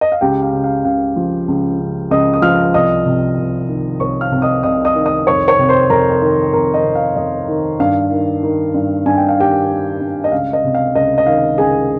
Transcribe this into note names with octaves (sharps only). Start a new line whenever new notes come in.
D#5
F5
C#2 G4 G5
F5
C#3
F5
C#2 F5
F3
C#2
C#3
C#2 D#5 D#6
D#6
F3 F5 F6
C2 D#5 D#6
C3
C2
D#3
C2 C#5 C#6
F5 F6
C3
D#5 D#6
C2 D#5 D#6
D#5 D#6
D#3
D#5 D#6
F2 C#5 C#6
C#5 C#6
C3
C5 C6
F2 A#4 A#5
D#3
F2 A#4 A#5
D#5
C3
F5
F2 D#5
D#3
G2 F5
D#3
D#3
G2
G2 G#5
G5
F5
D#3 G4 G5
D#3
G2
D#5
C#2 F5
D#5
C3
F5
C#2 D#5
D#5
D#3 F5
C#2 G#4 G#5